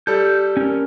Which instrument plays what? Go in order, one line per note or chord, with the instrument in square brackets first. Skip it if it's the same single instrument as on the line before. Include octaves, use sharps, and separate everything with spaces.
[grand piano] G3 A4 [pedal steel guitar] G6
[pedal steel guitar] C#4 A#4